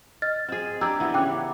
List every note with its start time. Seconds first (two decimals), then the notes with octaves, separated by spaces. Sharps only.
0.22 D#5 F6 A6
0.48 C4 G#4
0.81 D4 G4 A#5 E6 G#6
1.00 E3 B3
1.14 C#3 C#5 G5 D6 F#6